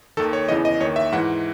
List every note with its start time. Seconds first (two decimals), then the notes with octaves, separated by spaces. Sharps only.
0.17 D#2 D#3 A4
0.33 C#5
0.48 E2 C#3 E3 D#5
0.65 D#5
0.80 D#2 C#5
0.85 D#3
0.96 E5
1.12 G#2 E3 F#5